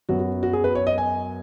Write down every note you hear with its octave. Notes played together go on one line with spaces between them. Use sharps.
F#2 F#3 B3 F#4
F#4
F#4
G#4
B4
C#5
D#5
G#5